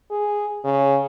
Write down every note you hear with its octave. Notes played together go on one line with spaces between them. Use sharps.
G#4
C#3